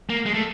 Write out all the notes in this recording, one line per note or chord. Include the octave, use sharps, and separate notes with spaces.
A#3
G#3
A3